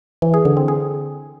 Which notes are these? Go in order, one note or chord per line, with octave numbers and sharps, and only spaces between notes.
E3
G#4
D3
C4
G#4